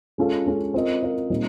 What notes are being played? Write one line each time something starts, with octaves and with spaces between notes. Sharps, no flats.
G#3 C#4 F4 A4
G#3 C#4 F4 A4
C4 F4 A#4 D#5
C4 F4 A#4 D#5
A#2 G3 C4 D#4